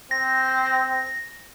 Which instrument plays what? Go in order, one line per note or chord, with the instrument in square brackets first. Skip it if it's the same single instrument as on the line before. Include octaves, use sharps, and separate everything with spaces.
[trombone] C4 [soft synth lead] A#6